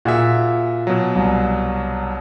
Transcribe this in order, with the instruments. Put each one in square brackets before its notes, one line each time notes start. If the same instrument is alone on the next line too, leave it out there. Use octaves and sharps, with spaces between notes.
[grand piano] A#2 [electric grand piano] F#4 G#4 E5
[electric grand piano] B2 F#3
[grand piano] C2